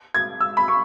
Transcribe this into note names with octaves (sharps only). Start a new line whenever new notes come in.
G#6
E6
B5
C#6